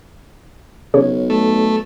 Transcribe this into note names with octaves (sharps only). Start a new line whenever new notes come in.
B1 C#3 C#5
A3